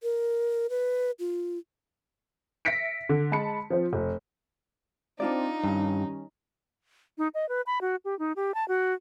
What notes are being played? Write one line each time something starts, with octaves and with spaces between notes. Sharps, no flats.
A#4
B4
F4
E5 A#6 B6 C#7 D7
D3
G#3 A5 B5 C#7
F3 C4 C5
F1
C4 D4 D#4 F4 D5
G2 D#3 G3 C#4
D#4
D#5
B4
B5
F#4
G4
D#4
G4
A5
F#4